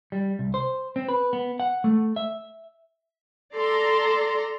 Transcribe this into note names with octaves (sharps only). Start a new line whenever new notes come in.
G3
C2
C5
C4
B4
B3
F#5
A3
E5
A4 D5 A#5 C6